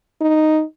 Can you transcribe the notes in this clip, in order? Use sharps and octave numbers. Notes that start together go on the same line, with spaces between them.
D#4